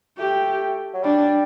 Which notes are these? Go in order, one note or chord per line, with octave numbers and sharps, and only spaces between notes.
A3 G4
F#3
G3 D4